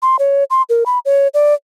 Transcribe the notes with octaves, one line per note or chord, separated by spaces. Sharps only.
C6
C#5
C6
A#4
B5
C#5
D5